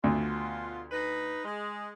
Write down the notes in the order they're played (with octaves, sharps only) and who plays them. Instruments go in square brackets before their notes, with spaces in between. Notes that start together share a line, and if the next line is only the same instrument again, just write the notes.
[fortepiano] D2 [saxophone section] B2 F4
[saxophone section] D#4 B4
G#3